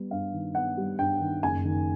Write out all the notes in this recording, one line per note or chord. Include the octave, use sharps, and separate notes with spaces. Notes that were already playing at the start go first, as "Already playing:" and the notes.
Already playing: G3 B3
G2 F5
D#3
B3 F#5
G3
G2 G5
D#3
F#1 G#5
D#3